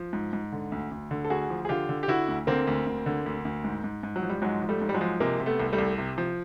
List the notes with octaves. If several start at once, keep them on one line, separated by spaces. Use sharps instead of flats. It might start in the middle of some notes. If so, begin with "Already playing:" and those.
Already playing: F3
G#2
G#2
D3
D2
D2
D3
A4
D2 F#4 G#4
F3
G#4
D3 F4 G4
D3
G4
D3 E4 F#4
D2
D3 A#3 C4
D2
D2
D3
D2
D2
G#2
G#2
G#2
F#3
F3
G3
G#2 F#3 G#3
F3
G3 A3
G#2
G3
F#3 G#3
F3
C3 G#3 A#3
C3
A3 B3
C2
G3 A3
C2
C3
F3